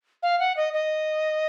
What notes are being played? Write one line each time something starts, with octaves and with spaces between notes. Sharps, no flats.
F5
F#5
D#5
D#5